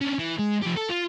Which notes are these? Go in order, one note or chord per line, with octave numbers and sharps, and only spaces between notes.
C#4 D4
E3
G#3
F3 G4
A4
F4